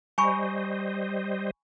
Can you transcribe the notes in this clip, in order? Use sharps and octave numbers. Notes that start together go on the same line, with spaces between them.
G3 C5 D#5 G#5 B5 C#6